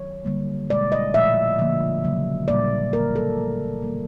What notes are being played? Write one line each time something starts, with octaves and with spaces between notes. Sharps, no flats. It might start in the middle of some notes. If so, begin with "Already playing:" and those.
Already playing: D#3 F#3 C#5
D3 G3 A#3
B2 G#3 D5
D#5
A#2 F3 A3 E5
D3 F3 A#3
C#3 F#3 A#3
A#2 G3 A#3 D5
D3 F3 A#3 A#4
A4
D3 F3 A3
D#3 G3 A#3